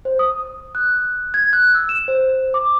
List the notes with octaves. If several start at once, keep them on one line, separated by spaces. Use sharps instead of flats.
C5
D#6
F#6
G#6
F#6
E6
E7
C5
D6